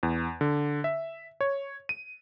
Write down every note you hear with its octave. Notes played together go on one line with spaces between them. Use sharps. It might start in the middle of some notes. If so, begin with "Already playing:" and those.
E2
D3
E5
C#5
D#7